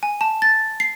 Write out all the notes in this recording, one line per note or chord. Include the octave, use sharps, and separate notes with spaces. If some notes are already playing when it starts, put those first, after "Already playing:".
G#5
A5
A6
C7